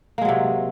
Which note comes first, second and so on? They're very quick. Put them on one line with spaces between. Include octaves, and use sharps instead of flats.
A#3 G#3 F#3 C3